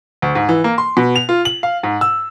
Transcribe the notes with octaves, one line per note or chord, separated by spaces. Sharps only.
D2
G#2
E3
A#3
C6
B2
F7
F4
F#7
F5
G#2
E6